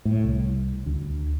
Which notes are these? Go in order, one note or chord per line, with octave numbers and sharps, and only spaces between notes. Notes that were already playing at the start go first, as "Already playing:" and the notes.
A2
C2
D2